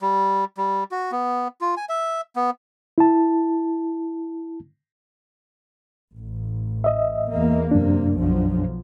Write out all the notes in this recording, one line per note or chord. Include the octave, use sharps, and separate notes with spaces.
G3
G3
F#4
B3
F4
G#5
E5
B3
E4 A5
A1
D#5 E5
E2 A#3
F#2 C3 A#3 D4
B1 F3 F#3